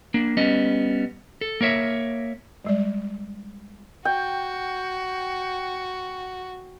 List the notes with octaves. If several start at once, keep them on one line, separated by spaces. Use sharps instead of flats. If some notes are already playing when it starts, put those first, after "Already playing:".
A#3 D4
G3 B3 C#4 D#5
A4
A#3 A#4 C#5 E5
G3 G#3 D5
F#4 G5